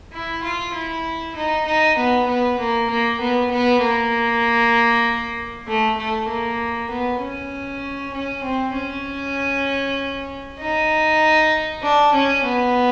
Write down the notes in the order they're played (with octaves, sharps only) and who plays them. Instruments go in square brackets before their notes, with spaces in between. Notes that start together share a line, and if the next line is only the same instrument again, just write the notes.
[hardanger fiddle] E4
F4
E4
D#4
D#4
B3
B3
A#3
A#3
B3
B3
A#3
A3
A3
A#3
B3
C#4
C#4
C4
C#4
D#4
D4
C#4
B3